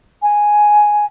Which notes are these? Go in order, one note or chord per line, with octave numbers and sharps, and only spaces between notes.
G#5